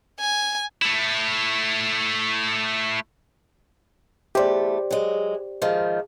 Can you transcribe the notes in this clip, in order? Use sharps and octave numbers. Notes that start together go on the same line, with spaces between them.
G#5
A3 E4
E2 A3 G4 C5 D5
F#3 G#3
G#2 D#3 F3